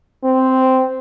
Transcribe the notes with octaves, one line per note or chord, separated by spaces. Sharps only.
C4